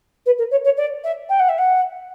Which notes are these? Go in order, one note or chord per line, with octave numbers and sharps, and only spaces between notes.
B4
A#4
C#5
C#5
D5
E5
G5
F#5
E5
F#5